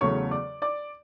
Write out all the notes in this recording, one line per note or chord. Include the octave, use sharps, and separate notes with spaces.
E2 C#3 F#3 A3 C#5 C#6
D5 D6
D5 D6